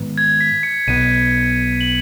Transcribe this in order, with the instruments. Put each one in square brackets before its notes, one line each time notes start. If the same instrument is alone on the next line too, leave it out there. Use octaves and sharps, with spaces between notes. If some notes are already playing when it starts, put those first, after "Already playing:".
Already playing: [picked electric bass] G#2 D#3 B3
[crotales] G#6
B6
C#7
[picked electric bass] B1 B2 B3 [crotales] D#7
[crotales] F#7